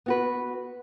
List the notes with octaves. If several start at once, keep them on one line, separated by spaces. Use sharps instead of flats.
B3 F#4 B4